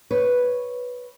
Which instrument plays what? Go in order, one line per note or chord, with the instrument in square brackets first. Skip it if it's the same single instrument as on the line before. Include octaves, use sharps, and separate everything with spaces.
[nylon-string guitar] B4 C#5